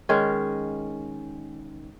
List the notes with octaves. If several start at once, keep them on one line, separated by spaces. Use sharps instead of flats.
D#3 G#3 C#4